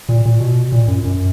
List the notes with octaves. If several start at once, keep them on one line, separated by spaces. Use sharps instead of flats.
A#2
A#2
B2
A#2
F#2
F#2